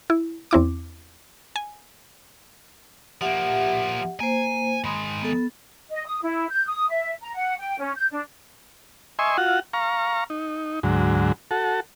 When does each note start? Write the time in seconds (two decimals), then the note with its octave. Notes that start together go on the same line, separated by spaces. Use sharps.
0.10 E4
0.51 E2 C4 E4 D6
1.56 G#5
3.21 F3 A#3 G4 E5 F#5
4.20 A#3 C5 G#5
4.84 D#3 G#3 B5 C6 D#6
5.22 B3 A4
5.90 D#5
6.06 D#6
6.23 E4
6.49 G6
6.67 D#6
6.89 E5
7.21 A#5
7.34 F#5
7.59 G5
7.79 C#4
7.95 G6
8.10 D4
9.19 D#5 E5 G#5 C6 C#6
9.38 F4 F#4 F#5
9.73 F5 A#5 C#6
10.30 D#4
10.83 D2 G#2 F#3
11.51 F#4 A4